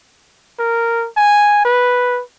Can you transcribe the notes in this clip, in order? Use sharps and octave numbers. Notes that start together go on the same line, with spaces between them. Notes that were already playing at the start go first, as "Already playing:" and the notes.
A#4
G#5
B4